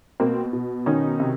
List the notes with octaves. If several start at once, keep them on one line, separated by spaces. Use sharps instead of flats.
B2 A#3 C4
B2
D#3 C#4 D#4
C3